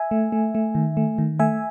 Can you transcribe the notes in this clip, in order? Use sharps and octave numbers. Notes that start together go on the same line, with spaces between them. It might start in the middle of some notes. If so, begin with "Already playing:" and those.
Already playing: E5 G#5
A3
A3
A3
D#3
A3
D#3
A3 E5 G#5